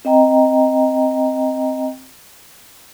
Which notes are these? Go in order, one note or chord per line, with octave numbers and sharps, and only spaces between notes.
C4 D#5 G5 A#5